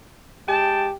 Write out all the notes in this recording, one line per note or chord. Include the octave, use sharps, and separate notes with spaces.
G#3 G4 G5 A5